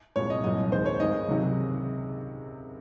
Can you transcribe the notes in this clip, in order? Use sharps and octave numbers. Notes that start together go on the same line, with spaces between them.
C2 A#2 F3 G#3 C#5
D#5
C2 A#2 F#3 D#5
D#2 D#3 G#3 C5
C#5
G#1 G#2 D#3 G#3 D#5
C#2 C3 D#3 F#3